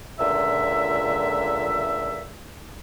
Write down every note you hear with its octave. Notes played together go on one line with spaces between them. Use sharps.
C#2 A#2 D3 E5